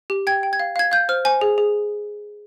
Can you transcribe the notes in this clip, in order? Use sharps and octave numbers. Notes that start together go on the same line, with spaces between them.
G4
G5 G#6
G5
G#6
F5
F5 G#6
F5 G6
C5 F6
C5 G#5
G#4
G#4